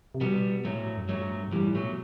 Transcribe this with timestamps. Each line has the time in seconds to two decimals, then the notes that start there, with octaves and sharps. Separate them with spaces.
0.15 C3
0.21 B2 G3 B3
0.65 A2 F#3 A3
0.97 F#2
1.08 G2 F#3 A3
1.48 B2
1.52 A2 E3 G3
1.68 A2
1.75 F#3 A3
1.81 B2